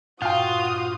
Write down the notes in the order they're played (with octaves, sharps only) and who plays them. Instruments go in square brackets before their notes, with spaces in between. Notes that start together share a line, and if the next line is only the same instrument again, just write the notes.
[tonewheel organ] G2 A#2 [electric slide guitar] F4 [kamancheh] F#4 D#6 [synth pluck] F5 G5